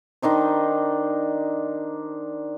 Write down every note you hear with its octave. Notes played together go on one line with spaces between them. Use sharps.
D#3 D4 D#4 C5